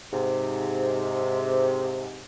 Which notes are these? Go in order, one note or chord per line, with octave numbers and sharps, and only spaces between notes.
G#2 C3